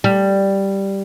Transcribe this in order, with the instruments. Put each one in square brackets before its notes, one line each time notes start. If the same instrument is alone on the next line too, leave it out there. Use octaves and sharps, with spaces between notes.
[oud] G3